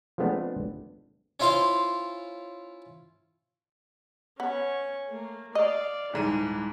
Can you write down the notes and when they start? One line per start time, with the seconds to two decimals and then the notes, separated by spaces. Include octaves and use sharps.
0.18 F3 G#3 A3 B3 C4 D4
1.40 C#4 E4 F4 C5 F5 C6
4.40 B3 C#4 C#6
5.07 A3 A#3
5.55 D5 D#5 F5
6.13 D#1 G#2 E4 D#7